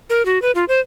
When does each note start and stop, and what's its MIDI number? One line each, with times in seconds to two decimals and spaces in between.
0.10 0.25 70
0.25 0.41 66
0.42 0.51 71
0.55 0.65 65
0.68 0.80 72